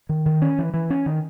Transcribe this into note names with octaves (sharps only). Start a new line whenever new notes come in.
D#3
D#3
C#4
E3
E3
C#4
D#3